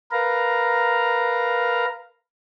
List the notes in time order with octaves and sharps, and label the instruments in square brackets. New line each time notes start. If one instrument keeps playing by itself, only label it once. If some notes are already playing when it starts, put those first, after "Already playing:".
[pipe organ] A#4 B4 F5 A#5